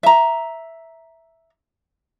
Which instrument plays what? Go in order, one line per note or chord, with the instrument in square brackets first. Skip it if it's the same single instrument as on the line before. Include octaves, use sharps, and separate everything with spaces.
[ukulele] E5 A#5